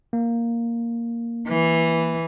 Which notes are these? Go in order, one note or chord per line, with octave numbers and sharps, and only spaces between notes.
A#3
E3